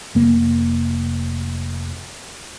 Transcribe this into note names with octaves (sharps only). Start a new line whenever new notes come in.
F1 A#3